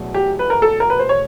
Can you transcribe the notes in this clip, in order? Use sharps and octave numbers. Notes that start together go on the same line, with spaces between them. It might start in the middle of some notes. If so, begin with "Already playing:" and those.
Already playing: E2 B2 F#3 A3
G4
B4
A#4
A4
A#4
B4
C5
C#5